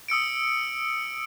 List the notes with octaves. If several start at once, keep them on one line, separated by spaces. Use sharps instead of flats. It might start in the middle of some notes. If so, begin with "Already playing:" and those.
D#6 E6 C#7 D7